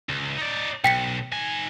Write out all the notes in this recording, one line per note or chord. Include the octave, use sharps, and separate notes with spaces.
C#2
D#4 D5
B1 G5 B6 C#7
D#3 G#5